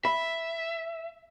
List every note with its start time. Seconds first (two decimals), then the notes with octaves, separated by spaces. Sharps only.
0.05 E5 B5